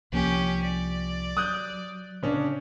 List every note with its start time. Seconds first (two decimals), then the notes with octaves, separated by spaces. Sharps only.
0.12 C2 F3 A#3 C#4 G4
0.64 D5
1.37 F#3 D#6 F#6 G6
2.23 C#3 C#4 D4